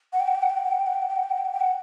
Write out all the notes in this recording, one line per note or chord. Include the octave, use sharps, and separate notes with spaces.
F#5
G5
F#5
G5
F#5
G5
F#5
G5
F#5
G5
F#5
G5
F#5
G5
F#5
G5
F#5
G5
F#5
G5
F#5